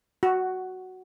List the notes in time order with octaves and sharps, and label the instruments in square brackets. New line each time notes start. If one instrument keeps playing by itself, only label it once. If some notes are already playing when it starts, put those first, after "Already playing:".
[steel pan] F#4